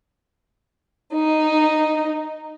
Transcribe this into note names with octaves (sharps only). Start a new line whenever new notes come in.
D#4